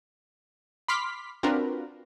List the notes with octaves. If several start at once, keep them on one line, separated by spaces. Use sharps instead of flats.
B5 C6 D6 F6 B6
C4 D4 F4 F#4 A#4 B4